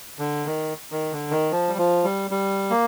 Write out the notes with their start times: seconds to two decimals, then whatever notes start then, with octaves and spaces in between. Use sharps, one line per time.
0.19 D3
0.46 D#3
0.92 D#3
1.12 D3
1.31 D#3
1.51 F3
1.69 G3
1.78 F3
2.04 G3
2.31 G3
2.70 A#3